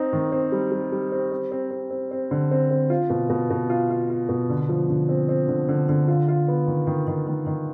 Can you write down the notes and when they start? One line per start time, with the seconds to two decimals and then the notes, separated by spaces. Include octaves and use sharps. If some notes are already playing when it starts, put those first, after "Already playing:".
Already playing: C4 D#4
0.13 D#3
0.32 C4
0.52 G3
0.71 G3
0.92 G3
1.12 C4
1.32 C4
1.52 C4
1.71 C4
1.90 C4
2.11 C4
2.31 D3
2.51 C4
2.71 C4
2.90 F4
3.10 B2
3.29 B2
3.50 B2
3.70 F4
3.90 F4
4.10 F4
4.29 B2
4.49 D3
4.69 F3
4.90 D3
5.09 C4
5.29 C4
5.48 D3
5.68 D3
5.89 D3
6.08 F4
6.28 F4
6.48 B3
6.67 D#3
6.87 D#3
7.07 D#3
7.27 D#3
7.47 D#3